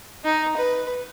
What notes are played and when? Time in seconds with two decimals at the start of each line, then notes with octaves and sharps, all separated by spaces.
0.24 D#4
0.57 B4